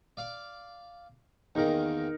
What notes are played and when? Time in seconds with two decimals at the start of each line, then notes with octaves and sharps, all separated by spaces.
0.17 D5 F5 D6
1.55 E2 D#3 A#3 D#4 A#4